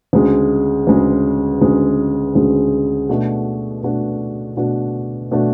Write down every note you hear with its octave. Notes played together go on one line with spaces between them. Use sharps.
D2 C#3 G#3
D2 C#3 G#3
D2 C#3 G#3
D2 C#3 G#3
B2 A3 D4 F#4
B2 A3 D4 F#4
B2 A3 D4 F#4
B2 A3 D4 F#4